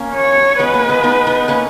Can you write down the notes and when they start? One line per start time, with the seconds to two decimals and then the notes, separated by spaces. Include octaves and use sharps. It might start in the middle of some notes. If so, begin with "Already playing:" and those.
Already playing: A#3 C#4
0.15 C#5
0.59 G#3 B3 B4
0.74 A#3
0.89 G#3 B3
1.04 B3 D#4
1.27 B3 D#4
1.48 A#3 C#4